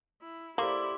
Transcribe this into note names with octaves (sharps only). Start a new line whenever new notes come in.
E4
A#3 E4 G4 A4 C5 D5 C6 D6